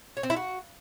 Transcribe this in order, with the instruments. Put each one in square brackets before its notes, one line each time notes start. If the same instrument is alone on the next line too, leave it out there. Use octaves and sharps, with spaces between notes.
[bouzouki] C#5
C4
E4
F#4